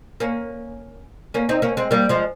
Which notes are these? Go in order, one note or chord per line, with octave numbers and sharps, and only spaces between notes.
A#3 C#4
A#3 C#4
C4 D#4
A#3 C#4
G#3 C4
G3 A#3
F3 G#3